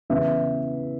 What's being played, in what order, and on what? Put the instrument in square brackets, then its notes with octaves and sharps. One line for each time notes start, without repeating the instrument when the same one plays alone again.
[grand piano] C#3 E3 B3 E5